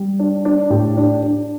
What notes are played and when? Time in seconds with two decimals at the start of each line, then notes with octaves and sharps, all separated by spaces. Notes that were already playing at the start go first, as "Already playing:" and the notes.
Already playing: G3
0.19 D4
0.45 D4
0.70 A2 G4
0.97 D4
1.22 D4